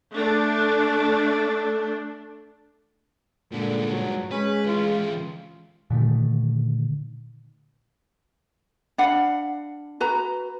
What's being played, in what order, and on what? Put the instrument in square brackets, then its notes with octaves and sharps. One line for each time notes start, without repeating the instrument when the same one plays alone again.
[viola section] A3 D4
[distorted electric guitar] G2 G#3 [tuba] A#2 [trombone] D3
[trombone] F#3
[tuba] G#3 [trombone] C#4 [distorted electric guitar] B4
[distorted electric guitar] E3 C#4 [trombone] F4
[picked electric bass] A#2 D3 D#3 A3
[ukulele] D4 F5 F#5 B5
F#4 B4 A#5